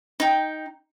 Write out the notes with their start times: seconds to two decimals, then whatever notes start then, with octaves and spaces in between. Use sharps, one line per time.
0.20 D#4 G5